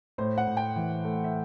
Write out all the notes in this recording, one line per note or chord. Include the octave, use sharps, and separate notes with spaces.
A2 C5
F#5
A2
G5
E3
A3
E5